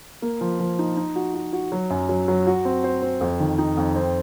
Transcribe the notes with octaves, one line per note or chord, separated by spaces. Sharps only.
A#3
F3
F3
D#4
D#4
F#4
F#4
F#4
F#3
F#2
F#3
F#3
F#4
C4
C5
C4
F2
D#3
D#4
F2
C4